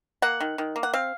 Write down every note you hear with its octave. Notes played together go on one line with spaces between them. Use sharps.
A#3 F#5
D#3
D#3
A#3
F#5
C4 F5